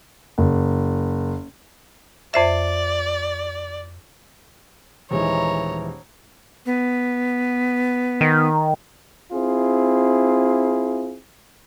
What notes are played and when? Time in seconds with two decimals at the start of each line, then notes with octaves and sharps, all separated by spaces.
0.38 F#1
2.34 F2 C5 D5 E5
5.11 D#1 E3 G#3 D#4 C#5 A#5
6.66 B3
8.21 D#3
9.31 C4 E4 F4 G#4